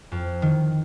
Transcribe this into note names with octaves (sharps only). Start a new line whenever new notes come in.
F2
D#3